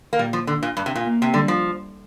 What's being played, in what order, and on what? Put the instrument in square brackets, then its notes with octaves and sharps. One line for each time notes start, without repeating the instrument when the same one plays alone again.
[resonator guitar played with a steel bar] A#3
[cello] A#2 [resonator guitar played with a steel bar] G3
[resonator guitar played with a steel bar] F3
D3
A#2
G2
C3
A#2
[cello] A#3
[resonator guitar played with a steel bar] C3
[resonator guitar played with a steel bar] D3 [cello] G3
[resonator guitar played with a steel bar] F3